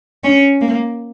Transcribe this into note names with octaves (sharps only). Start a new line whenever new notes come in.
C#4
A#3